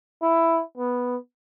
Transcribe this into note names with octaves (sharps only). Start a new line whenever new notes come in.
E4
B3